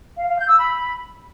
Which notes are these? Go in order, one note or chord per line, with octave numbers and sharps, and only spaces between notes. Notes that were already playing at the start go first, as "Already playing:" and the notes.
F5
F5
G6
E6
B5